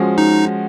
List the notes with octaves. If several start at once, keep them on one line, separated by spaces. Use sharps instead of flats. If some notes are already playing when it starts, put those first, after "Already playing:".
Already playing: F3 G#3 C#4 F#4
D#4